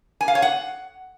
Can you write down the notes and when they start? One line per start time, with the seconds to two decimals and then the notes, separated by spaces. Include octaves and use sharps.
0.21 G#5
0.28 F5
0.35 C#5
0.42 F#5